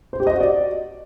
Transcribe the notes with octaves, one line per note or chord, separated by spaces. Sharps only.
C5
G4
D#5
F#4
D5